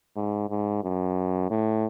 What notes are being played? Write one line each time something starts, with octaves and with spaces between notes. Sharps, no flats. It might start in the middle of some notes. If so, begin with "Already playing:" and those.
G#2
G#2
F#2
A2